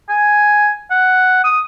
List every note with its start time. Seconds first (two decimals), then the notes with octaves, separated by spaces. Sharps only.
0.09 G#5
0.91 F#5
1.44 D#6